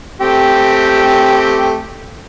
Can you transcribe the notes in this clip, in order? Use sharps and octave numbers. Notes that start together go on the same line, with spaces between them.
A3 C4 G4